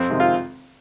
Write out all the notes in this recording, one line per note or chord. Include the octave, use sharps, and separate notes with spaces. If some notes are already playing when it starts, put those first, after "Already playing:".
Already playing: F2 C4
C3 D#3 G#3
F4